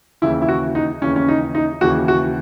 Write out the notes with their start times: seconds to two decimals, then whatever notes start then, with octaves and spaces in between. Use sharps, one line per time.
0.22 D#2 C#3 E3 E4
0.42 E4
0.49 F#4
0.75 D#4
1.02 D#2 C#3 E3 C#4
1.16 C#4
1.28 D#4
1.55 D#4
1.81 D#2 C#3 E3 F#4
2.08 F#4